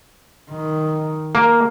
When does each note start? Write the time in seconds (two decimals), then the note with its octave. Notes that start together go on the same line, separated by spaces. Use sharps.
0.50 D#3
1.35 A#3